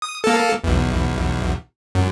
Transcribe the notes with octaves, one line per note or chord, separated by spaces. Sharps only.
D#6
A#3 A4
B1 E2
F#2